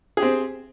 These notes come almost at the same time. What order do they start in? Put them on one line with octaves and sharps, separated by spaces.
G#4 G4 C4